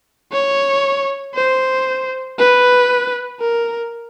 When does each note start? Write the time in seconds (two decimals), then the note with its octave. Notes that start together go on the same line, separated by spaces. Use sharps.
0.32 C#5
1.35 C5
2.39 B4
3.40 A#4